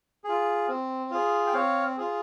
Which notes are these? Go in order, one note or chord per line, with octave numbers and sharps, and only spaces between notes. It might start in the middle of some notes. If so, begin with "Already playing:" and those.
F4 G#4
C4
F4 G#4
G5
C4 C#5 F5
F4 G#4